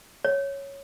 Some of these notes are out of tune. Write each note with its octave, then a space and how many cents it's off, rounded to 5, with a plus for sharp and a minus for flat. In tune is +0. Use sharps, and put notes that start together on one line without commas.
C#5 +0